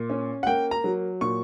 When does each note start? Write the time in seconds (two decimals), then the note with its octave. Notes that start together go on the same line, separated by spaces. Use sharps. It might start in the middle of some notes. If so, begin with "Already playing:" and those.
Already playing: A#2
0.10 C#4
0.43 F#5
0.47 A#3 G5
0.71 A#5
0.84 F#3
1.21 A#2 C#6